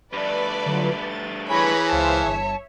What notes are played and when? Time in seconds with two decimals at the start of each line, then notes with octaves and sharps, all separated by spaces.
0.13 G2 A3 B4 D5
0.66 D3 F#3 F4
0.99 A6
1.49 E3 G#4 B4 C#5 G#5 A#5 B5 A#6
1.90 C#2 C5 C#5 E5 F5 A5
2.25 G1